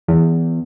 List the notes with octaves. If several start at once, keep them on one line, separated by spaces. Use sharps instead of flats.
E2